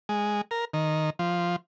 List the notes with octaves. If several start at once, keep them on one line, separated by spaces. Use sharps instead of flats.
G#3
A#4
D#3
F3